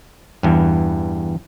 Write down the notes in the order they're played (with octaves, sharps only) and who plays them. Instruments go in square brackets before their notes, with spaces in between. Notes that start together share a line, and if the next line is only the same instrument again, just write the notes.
[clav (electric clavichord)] E2 G2